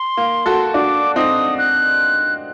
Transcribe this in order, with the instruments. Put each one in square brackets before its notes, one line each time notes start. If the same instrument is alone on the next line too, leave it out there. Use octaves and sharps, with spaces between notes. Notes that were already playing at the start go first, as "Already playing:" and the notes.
Already playing: [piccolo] C6
[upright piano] A#3
F#4 A4
[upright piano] D4 F#4 [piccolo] D6
[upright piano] C4 D#4 [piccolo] D#6
[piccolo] F#6